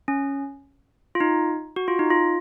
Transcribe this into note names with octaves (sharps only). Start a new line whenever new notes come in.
C#4
F4
D#4
F#4
F4
D#4
F4